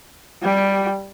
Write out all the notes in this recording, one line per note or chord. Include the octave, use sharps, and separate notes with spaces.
G3 G4